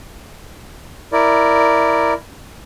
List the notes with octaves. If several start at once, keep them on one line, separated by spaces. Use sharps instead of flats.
E4 A#4 D5